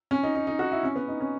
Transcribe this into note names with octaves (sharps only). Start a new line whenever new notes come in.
C#4
D#4
D#4
D#4
F#4
E4
C#4
B3
D#4
C#4